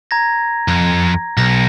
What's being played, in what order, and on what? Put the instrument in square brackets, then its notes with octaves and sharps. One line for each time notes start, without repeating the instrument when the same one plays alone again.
[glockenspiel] A#5 G#6 A#6
[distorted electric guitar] F2
[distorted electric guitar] B1 [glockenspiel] A#6